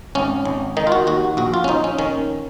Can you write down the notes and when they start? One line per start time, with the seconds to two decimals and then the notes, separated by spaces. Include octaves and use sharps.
0.15 G#1 C#4
0.45 G#1
0.77 D#3 D#4
0.87 F4
0.92 F#4
1.07 D#2 F#4
1.37 A#1 F#4
1.54 F4
1.64 C#4
1.68 A#1 D#4
1.84 C#4
1.99 D#3 C#4